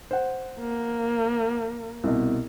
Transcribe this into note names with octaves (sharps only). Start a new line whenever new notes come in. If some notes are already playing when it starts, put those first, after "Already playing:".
C5 F#5
A#3
C2 B2